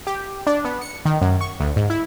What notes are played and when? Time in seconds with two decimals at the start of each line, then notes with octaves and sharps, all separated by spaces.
0.07 G4
0.47 D4
0.65 B3
0.81 C#7
1.05 D#3
1.21 F#2
1.41 C#6
1.60 D2
1.76 G#2
1.90 E4